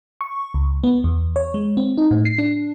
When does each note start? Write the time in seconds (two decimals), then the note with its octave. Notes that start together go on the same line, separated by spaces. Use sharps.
0.21 C#6
0.54 C#2
0.84 B3
1.04 E2
1.36 C#5
1.54 G#3
1.77 C4
1.98 D#4
2.11 A2
2.25 C7
2.38 D4